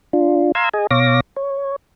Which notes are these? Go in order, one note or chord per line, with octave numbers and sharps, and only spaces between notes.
D4 F4
F5 A#5 C6 E6 G#6
G#4 D#5 G#5
B2 C#5 F5 D6 A#6
C#5